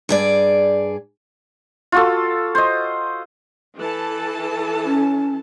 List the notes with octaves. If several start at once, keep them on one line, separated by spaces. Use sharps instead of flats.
G2 G#4 D5
F4 F#4 A4
C5 D#5
E3 A4 A5
C#4